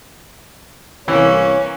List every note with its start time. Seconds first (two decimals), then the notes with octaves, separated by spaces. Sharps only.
1.08 C2 E3 A#3 C#4 C#5